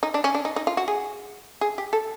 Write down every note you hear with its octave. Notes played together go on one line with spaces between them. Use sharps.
D#4
D4
C#4
D4
D#4
D#4
F4
F#4
G#4
G#4
G4
A4